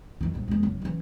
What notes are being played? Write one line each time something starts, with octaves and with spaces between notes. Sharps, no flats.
F2 E3
A#1 G2
E2 G#3
F#1
E3 C#4